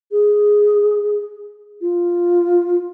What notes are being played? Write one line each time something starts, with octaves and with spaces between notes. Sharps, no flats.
G#4
F4